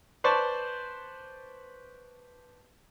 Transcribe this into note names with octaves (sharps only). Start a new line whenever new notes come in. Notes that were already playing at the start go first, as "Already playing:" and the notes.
B4 C5 D5 A5 C#6